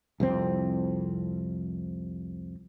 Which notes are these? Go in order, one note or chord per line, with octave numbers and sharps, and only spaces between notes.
C2 F2 C4